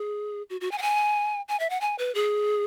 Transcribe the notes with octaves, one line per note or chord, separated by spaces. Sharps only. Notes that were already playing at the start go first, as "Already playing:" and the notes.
Already playing: G#4
F#4
F#4
G#5
F#5
G#5
G#5
E5
F#5
G#5
B4
G#4